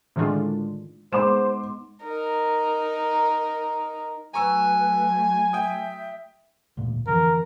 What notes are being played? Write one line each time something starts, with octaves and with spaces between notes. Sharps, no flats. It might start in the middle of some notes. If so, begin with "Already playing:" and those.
A2 D3 D#3 G#3 D4 F4
G#3 B3 D#4 C5 C6 D6 E7
D#4 A#4
F#3 A3 B4 G#5 A#5 C#6 E6
E5 G5 D#6
E1 D2 A#2
F2 D3 E3 A#4